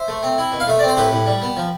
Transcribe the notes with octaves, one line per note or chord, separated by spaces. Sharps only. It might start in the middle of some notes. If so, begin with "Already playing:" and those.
Already playing: C5 E5
A3
C4
E4
B2
F5
A3 E5
C4 D5
C5
A2 G4 B4
A2
G3
B3
F3